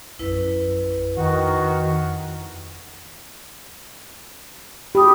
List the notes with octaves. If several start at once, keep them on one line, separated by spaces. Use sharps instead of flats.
A#1 F#2 E4 B4
F2 D#3 F#4
G4 B5 D#6